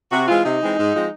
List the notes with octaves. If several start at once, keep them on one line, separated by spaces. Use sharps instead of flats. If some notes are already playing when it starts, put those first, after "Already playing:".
C3 F#4
E3 G#3 C4 F4
C3 D#4
E3 G#3 C4
G#2
F3 G#3 C4